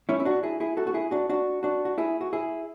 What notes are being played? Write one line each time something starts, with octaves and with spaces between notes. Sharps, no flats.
C#4 E4
E4
D4 F#4
E4 G#4
E4 G#4
F#4 A4
F#4
E4 G#4
D4 F#4
D4 F#4
D4 F#4
F#4
E4 G#4
F#4
E4 G#4